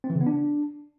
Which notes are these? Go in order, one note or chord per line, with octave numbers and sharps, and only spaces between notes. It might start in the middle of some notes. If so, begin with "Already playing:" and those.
C4
E3
C#3
B3
D4